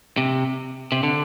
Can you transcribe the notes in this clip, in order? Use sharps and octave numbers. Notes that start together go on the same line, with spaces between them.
C3
C3
D3